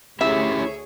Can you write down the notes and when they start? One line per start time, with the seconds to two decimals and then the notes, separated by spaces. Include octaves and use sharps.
0.21 D2 C#4 E4 G4 G#4 C#5 E5